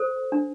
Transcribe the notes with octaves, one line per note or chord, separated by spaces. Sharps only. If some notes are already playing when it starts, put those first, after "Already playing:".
Already playing: A4 C5
D4